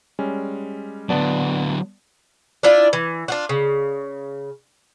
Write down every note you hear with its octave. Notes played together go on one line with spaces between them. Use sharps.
G3 G#3 C#4
D3 F#3 B3 D5 A5
D4 E4 F4 D5
E3
D4 F4 F#4
C#3